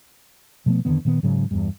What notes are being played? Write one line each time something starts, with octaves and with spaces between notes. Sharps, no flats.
B2 F3 A3 B3
F2 D3 D#3 B3
A#2 D#3 B3
G#2 C#3 F#3 C#4
E2 G2